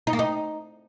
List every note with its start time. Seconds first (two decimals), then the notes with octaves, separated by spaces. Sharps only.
0.07 D#4
0.13 A#3
0.19 D#4